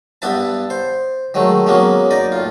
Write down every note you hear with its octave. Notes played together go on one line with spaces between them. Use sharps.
G2 B3 E4 B4 A5
C5
D#3 F#3 G#3 A3
F#3 G#3 A#3 B3 C#4
D#4 D5 D#5
A2 F4